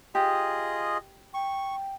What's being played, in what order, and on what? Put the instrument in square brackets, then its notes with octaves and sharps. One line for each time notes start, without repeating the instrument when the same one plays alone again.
[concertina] F4 G#4 D#5 [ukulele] G4
[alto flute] G5 [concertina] C#6